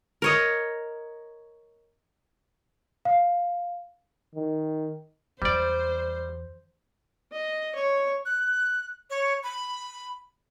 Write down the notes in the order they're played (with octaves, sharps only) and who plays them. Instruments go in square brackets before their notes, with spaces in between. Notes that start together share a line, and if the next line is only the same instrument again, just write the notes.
[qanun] A#4 C#5 D#5
[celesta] F5
[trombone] D#3
[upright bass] E2 [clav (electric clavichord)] G3 D5 [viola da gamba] C5
[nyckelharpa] D#5
C#5
[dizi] F#6
C#5
B5